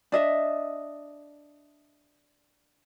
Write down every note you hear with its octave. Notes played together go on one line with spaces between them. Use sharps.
D4 D#5 E5